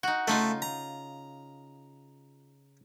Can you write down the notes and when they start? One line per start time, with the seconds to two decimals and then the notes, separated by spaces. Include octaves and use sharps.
0.03 D#4 F#4
0.28 C#3 A3 D#4 F4
0.62 A#5